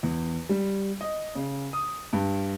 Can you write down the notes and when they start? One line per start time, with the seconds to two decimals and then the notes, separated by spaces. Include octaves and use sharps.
0.03 E2
0.49 G3
1.01 D#5
1.35 C#3
1.73 D#6
2.13 G2